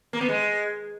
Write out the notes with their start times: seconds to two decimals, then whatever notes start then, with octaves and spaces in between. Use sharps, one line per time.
0.13 A#3
0.21 B3
0.29 G#3